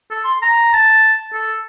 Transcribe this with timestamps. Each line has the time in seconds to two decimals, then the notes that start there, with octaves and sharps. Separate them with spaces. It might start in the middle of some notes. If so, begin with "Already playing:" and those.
0.10 A4
0.24 C6
0.42 A#5
0.73 A5
1.33 A4